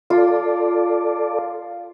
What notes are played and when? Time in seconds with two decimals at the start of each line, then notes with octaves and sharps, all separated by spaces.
0.10 F4 A4 D5